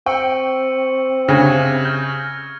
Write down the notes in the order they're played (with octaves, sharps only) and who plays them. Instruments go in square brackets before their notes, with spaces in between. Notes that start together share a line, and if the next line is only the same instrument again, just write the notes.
[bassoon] C4 [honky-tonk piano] G5 [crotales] C#6 E6 C#7
[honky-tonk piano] D2 [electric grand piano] C#3 [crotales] G#6 A#6
[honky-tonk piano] C3
[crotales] F6 [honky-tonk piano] G6